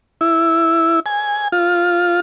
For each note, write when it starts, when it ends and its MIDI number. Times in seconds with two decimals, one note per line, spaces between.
0.21 1.00 64
1.06 1.48 80
1.52 2.20 65